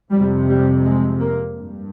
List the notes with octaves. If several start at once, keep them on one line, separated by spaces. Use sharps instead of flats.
F2 C3 G3
G3
G#3
A#3
G2